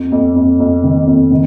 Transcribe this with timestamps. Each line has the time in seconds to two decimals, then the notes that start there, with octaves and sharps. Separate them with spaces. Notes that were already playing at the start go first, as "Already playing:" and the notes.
Already playing: F2
0.12 F2
0.36 F2
0.60 F2
0.84 D#3
1.07 F2
1.31 D#3